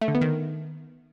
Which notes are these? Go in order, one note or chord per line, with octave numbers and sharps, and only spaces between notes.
A3
D3
B3
D#3